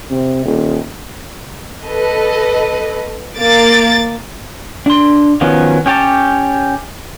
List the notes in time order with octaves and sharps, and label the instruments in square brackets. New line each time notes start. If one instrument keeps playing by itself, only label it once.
[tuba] C3
D#1
[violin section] A4 B4 D#5
A#3 D6 A6
[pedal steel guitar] D4 C6
D#3 F3 F#3 B3 C#4
C#4 G4 C#5 A5